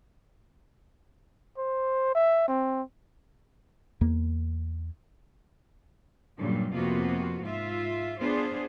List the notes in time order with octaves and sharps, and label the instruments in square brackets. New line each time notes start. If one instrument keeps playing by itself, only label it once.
[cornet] C5
E5
C4
[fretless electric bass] E2 A#3
[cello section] G2 A#2 C#3 F#3 G3
F2 C3 A#3 B3 F4 F#4
G#2 F4 E5
B3 D4 F4 G#4 C5